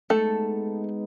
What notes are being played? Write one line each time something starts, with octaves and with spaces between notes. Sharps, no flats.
G#3 A3 B3 D#4 A4